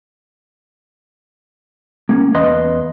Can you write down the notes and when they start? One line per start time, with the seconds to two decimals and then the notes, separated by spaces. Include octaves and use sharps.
2.09 A#3 C#4
2.35 E2 B4 D#5 F5 C6